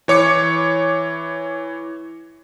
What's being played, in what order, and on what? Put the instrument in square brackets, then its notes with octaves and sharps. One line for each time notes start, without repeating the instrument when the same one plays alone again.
[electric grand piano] E3 C#5 D6 C#7